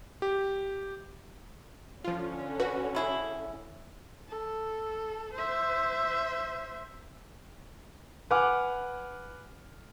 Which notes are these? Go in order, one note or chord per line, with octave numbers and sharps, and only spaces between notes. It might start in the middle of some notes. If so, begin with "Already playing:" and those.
G4
D3 F3 C#4 F4
F#4 B4
C#3 E4 G#4
A4
C5 E5
B4 F#5 G#5 D6 F6